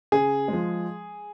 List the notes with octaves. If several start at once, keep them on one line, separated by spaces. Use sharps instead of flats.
C#3 G#4
F3 G#3